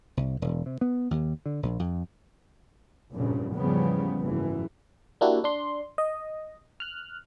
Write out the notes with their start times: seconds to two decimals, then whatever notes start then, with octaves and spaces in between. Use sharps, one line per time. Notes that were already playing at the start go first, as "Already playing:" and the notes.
0.17 C2
0.42 E1
0.66 C3
0.81 B3
1.11 D#2
1.46 D3
1.63 A#1
1.79 F2
3.13 F1 A#1 G2 A#2 C#3
3.55 E2 G#2 C#3 F3 G3 B3
4.20 F#1 G#2 E3
5.21 A#3 D4 E4 F#4 G4
5.44 D4 C6
5.98 D#5
6.80 F6 F#6